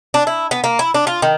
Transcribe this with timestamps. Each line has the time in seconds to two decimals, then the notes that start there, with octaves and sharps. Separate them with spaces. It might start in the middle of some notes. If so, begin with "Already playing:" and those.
0.14 D4
0.27 E4
0.51 B3
0.64 A#3
0.79 E4
0.94 D4
1.07 F4
1.22 D#3